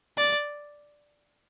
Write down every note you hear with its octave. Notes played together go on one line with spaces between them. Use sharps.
D5